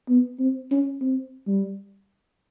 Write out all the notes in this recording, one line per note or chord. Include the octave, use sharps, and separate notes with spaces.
B3
C4
C#4
C4
G3